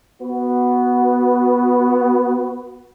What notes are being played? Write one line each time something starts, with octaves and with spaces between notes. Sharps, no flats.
B3 F#4